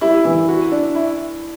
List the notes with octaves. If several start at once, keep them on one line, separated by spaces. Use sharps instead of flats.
G3 E4
E3
F#4
D4
E4